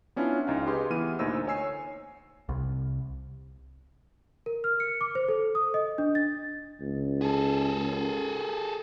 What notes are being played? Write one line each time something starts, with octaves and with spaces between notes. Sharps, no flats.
B3 C#4 D4 E4 F4
C#2 D#4 F5
G4 G#4 B4 C6
E3 B3 F6 D#7
D2 A#2 D#4 C5 E6
C#5 G#5 E6 C7
C2
A#4
F6
C#7
D6
C5
A4
D#6
D#5
D4
A6
C#2
G#4 A4